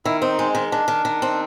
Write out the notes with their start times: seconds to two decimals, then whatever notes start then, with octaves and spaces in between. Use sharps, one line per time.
0.05 D#3 E4
0.21 C4 D#4
0.39 G#3
0.55 D#3
0.71 D#3 D4
0.88 D#3
1.05 D#3
1.22 C4